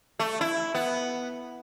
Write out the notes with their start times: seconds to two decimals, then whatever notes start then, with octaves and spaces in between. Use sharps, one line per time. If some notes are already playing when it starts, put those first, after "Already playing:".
0.19 A3
0.41 E4
0.75 B3